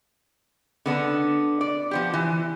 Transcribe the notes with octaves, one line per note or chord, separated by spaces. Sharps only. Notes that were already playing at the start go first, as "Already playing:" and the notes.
D3 B3 D4
D5
F3 B3 G4
E3